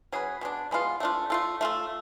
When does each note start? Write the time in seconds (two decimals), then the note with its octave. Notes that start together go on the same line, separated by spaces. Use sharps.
0.12 F#3 C#4 G#4 B4
0.41 B2 G#3 D4
0.71 B2 G#3 B3 F4
1.00 A3 D4 F4
1.30 A3 F4 A4
1.61 A3 F4 A4